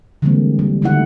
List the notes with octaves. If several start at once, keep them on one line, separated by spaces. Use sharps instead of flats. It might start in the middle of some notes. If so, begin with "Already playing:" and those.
D3 E3 G3 G#3 A#3 C4
G3
D3 D#3 A3 E4 F#5